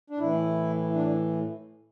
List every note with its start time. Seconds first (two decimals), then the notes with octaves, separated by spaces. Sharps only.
0.10 D4
0.19 A2 E3 E4
0.94 D4